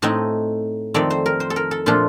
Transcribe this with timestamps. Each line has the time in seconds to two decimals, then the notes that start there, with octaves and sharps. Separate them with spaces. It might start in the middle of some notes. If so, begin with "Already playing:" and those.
0.02 A2 A3 C4 D#4 D#5
0.94 F2 D#3 A3 C4 D5
1.10 C5
1.26 A#4
1.40 C5
1.50 A4
1.56 A#4
1.71 A4
1.86 A#2 F3 A3 D4 F4